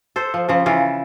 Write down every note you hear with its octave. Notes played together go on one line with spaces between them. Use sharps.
A4 C5
F3
C#3 F3
C#3 E3 F4